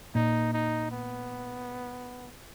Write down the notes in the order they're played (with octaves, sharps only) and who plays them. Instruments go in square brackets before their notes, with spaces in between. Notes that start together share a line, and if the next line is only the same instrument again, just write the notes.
[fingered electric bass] A#2 [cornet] D#4
[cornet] D#4
B3